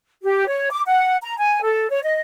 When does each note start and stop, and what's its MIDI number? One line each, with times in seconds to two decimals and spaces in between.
0.22 0.48 67
0.48 0.69 73
0.71 0.82 86
0.87 1.16 78
1.21 1.34 82
1.38 1.61 80
1.63 1.88 69
1.90 2.00 73
2.02 2.20 75